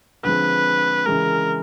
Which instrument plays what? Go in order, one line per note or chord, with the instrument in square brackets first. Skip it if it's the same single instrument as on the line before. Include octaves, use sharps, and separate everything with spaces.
[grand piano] D3 F3 G#3 C4 [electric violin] B4
[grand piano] C#3 E3 G#3 [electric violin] A#4